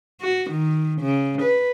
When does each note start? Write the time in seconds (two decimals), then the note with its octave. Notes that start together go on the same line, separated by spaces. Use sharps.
0.21 F#4
0.51 D#3
1.01 C#3
1.42 B4